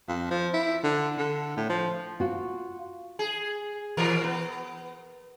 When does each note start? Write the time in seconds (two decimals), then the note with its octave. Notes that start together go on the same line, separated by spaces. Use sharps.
0.08 F2
0.31 F3
0.53 E4
0.83 D3
1.18 D3
1.57 A2
1.69 F3
2.20 F4 F#4
3.19 G#4
3.97 B2 E3 A#4
4.24 B3